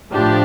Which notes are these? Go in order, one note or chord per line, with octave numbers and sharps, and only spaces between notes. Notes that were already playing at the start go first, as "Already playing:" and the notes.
A2 F3 D4 G4